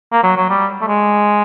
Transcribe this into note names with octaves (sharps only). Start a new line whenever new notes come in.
A#3
F#3
F#3
G3
A3
G#3